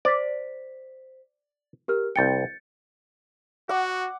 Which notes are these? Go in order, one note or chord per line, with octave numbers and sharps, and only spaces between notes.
C5 D5 B6
G4 A#4 F6
C2 G5 G6 A6 C#7
F#4 F#5 D6